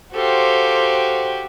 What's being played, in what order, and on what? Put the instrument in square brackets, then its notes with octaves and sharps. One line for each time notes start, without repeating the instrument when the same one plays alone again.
[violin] F#4 G4 [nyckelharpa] A4 F5 [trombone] C5